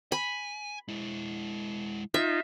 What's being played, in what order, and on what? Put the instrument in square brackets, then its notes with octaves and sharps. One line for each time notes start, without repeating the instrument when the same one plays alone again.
[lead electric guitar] G#5 [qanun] B5
[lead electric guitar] G#3 E4
[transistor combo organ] D#4 F4 [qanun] E5